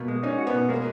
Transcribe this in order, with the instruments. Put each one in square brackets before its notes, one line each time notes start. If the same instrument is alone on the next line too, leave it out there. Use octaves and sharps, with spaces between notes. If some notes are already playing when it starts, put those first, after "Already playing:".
Already playing: [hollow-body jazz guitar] B2 [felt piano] A#3
[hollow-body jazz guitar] G#3
[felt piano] C#4 [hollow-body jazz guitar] D#4
[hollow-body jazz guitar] F#4
[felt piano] B3
[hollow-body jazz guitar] B2
[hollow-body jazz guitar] G#3 [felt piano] A#3